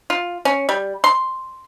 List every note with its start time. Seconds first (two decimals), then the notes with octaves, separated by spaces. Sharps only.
0.10 F4
0.45 C#4
0.69 G3
1.04 C6